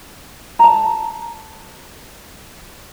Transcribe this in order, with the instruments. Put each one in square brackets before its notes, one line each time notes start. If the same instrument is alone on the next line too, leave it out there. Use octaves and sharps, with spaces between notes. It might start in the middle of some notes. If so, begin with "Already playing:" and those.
[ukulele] A5 A#5